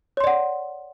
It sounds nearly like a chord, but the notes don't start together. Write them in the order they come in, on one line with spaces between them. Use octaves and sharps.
C#5 C6 D5 F#5